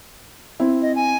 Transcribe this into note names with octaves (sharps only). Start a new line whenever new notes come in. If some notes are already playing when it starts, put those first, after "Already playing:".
C4 E4
D#5
G#5